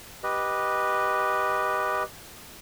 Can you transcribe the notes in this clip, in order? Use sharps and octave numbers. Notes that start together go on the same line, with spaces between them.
G4 B4 D#5